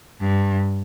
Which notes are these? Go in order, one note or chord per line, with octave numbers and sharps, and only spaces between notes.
G2